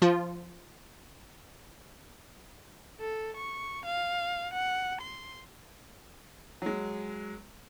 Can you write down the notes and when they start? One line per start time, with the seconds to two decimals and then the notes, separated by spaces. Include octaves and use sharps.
0.02 F3 F4
3.01 A4
3.37 C#6
3.85 F5
4.53 F#5
5.01 C6
6.62 F#3 G#3